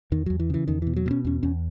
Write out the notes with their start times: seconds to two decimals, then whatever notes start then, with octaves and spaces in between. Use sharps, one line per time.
0.12 E2 D#3
0.26 E2 F#3
0.40 E3
0.50 C#3 E3
0.68 E2 D#3
0.82 B2 E3
0.96 F#3
1.06 B2 C#4
1.25 E2 C#4
1.43 E2 C#4